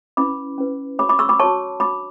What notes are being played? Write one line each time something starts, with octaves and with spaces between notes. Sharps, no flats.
C#4 E4 B4 B5 D6
C#4 E4 B4
F#4 C#5 B5 D6
B5 D6
C#6 E6
B5 D6
F#4 C#5 A5 C#6
D4 F#4 C#5 B5 D6